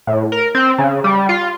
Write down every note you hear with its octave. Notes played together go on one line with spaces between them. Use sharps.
A2
A#4
C4
C#3
G3
F4